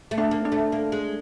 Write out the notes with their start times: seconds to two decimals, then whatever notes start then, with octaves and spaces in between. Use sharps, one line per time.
0.11 A3
0.18 D4
0.31 A#3
0.45 D4
0.52 A3
0.72 A#3
0.92 G#3